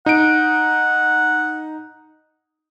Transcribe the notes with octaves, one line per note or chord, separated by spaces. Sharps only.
D#4 F#5 D7